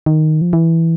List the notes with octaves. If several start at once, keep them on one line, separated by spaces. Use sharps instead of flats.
D#3
F3
E3